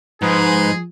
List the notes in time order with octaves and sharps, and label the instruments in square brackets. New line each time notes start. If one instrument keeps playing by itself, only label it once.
[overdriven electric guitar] G#2 [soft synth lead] F3 [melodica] D#4 B4 [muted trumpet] G#4